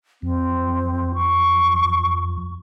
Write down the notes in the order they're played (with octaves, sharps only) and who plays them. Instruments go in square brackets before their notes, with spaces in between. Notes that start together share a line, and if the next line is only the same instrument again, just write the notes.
[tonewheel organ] F2 [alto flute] C4
[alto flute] C#6